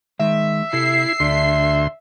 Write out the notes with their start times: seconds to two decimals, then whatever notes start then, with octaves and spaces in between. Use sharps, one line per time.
0.19 D#3 G#3 E5
0.73 C3 E4 A4 C7
1.20 D2 D4 A4 C6